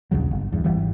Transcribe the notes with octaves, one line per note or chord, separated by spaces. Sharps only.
A#1 D#2 C#3 F#3
G1
E2 G2
G#1 D2 E3 G3